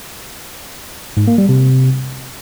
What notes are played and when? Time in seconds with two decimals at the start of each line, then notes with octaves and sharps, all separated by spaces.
1.17 G#2
1.28 A#3
1.38 G3
1.49 C3